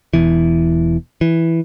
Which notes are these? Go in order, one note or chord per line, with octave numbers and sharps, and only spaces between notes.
E1 B2 E3
E3